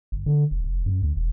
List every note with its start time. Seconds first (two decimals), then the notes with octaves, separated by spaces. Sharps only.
0.12 G1
0.26 D3
0.51 F1
0.64 F1
0.86 F#2
1.02 D2
1.16 E1